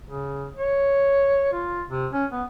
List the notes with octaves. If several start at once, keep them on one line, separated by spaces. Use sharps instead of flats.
C#3
C#5
F4
C3
C#4
B3